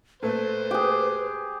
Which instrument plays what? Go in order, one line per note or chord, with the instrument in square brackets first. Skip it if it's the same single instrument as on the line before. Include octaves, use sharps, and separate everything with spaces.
[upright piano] A#2 A3 [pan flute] B4 [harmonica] C5
[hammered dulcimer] G4 G#4